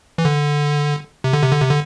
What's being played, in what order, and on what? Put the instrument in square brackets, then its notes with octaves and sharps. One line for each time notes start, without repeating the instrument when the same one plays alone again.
[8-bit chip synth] E3
D3
C3
D3
C3
D3
C3
D3